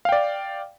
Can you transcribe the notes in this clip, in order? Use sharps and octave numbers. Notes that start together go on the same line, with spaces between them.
D5 F5 G5